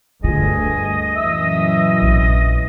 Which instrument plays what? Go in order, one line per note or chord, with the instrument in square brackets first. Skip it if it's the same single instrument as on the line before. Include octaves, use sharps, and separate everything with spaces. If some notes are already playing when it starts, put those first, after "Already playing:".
[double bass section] D2 G2 [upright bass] F4 [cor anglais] G#4 [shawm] D#5
[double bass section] F#2 A#2 E3 [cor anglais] E5
[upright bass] A#1